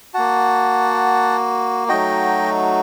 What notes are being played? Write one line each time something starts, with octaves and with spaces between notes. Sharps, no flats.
A#3 F#4 F#5 A5
F#3 A3 D#4 F#4 D#5 G5